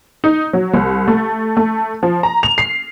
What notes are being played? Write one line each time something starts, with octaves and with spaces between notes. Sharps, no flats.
D#4
F#3
C2
A3
A3
F3
A#5
F7
C7